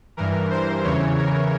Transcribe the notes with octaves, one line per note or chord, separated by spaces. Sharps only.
G2 E3 A#4
C5
E2 C#3 E3 C#5
A#4